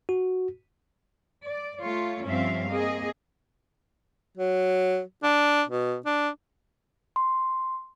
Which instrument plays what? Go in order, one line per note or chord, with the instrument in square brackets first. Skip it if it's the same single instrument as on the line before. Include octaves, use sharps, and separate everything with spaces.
[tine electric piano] F#4
[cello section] D5
A3 F4 C#5
G2 F3 C4 C#4 E5 F5
A#3 C4 G#4 D#5
[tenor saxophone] F#3
D4
B2
D4
[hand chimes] C6